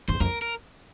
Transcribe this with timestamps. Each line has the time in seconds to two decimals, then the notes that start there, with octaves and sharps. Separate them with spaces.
0.08 E2 C5
0.20 F2 A#4
0.42 A#4